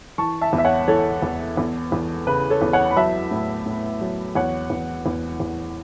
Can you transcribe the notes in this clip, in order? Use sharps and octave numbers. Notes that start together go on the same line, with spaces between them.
E3 A5 C#6
E5 A5
E2
E5
C#5 F#5
E3 A4 C#5
E2
E2
E2
C#3 B4
A4 C#5
E2
C#5 F#5
B5
F#3 E5 A5
A2
A2
F#3
E2 C#5 F#5
E2
E2
E2